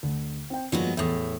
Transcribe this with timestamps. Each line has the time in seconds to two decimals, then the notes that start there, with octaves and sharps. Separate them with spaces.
0.03 D2
0.50 C4 G5
0.72 G2 F3 F#3 G#3 A#3 B3
0.97 E2 A2 E5 D#6